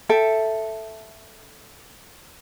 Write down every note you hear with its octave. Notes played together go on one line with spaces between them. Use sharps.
A4 E5 G5